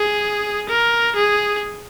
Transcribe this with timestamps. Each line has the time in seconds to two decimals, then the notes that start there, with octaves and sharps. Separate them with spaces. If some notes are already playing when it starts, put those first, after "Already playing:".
Already playing: G#4
0.69 A#4
1.16 G#4